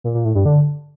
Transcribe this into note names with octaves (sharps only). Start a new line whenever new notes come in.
A#2
A#2
A2
G2
D3